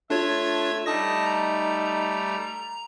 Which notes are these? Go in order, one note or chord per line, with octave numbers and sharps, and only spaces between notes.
A3 D4 F4 C#5 E5 G#6
G3 A3 D#4 A5 D#6 A#6
A#5